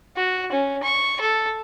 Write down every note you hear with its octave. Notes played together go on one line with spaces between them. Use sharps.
F#4
C#4
C#6
A4